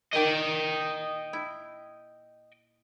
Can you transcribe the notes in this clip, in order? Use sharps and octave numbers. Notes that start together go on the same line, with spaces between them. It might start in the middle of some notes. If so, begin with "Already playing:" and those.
A#2 D#3 D5 D#5 G5
E4